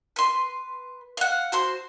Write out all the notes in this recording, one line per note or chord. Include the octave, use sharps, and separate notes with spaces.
B4 C6
F5 F#5
F#4 C5 C6